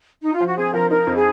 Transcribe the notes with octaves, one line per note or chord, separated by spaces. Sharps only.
D#4
F4
F3
F#4
C4 G#4
F3 A#4
D#4 A#4
F2
G#4